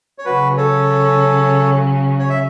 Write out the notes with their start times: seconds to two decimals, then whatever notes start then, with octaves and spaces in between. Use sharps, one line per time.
0.18 C#5
0.25 C#3 F#3 C#4 F#4 B4
0.57 A4 C#5
2.19 C#5
2.30 E5